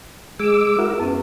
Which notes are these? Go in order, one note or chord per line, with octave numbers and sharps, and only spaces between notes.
G#3 G#4 D6 E6
E4 F#4 A#4
F#2 B3 C#4